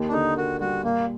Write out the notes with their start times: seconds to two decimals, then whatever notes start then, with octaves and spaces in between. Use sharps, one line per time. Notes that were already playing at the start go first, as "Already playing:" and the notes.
Already playing: D#2 D#3
0.09 D4
0.13 D3 D#4
0.37 A#3 F#4
0.61 G3 F#4
0.84 A#2 A#3